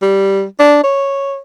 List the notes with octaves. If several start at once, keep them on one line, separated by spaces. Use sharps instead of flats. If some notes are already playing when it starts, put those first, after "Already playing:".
G3
D4
C#5